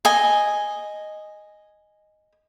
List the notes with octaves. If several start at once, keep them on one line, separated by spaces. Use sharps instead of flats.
D#5 G#5